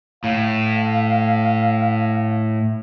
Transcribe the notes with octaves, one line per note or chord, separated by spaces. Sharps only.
A2 F5